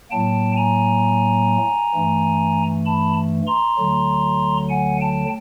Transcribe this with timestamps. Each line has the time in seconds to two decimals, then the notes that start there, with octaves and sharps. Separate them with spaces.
0.10 A2 F#3 A#3 G5 A5
0.56 G#5 A#5
1.94 G2 E3 A3
2.85 A5 B5
3.47 A#5 C6
3.78 D2 D3 F#3
4.69 F#5 G#5
5.00 G5 A5